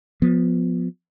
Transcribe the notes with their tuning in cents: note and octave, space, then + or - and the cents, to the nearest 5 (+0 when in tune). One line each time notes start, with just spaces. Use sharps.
F3 +25 B3 +0